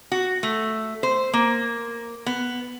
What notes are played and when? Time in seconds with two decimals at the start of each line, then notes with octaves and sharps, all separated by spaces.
0.12 F#4
0.43 A3
1.03 C5
1.33 A#3
2.26 B3